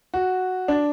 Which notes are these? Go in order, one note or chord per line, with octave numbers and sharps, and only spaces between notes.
F#4
D4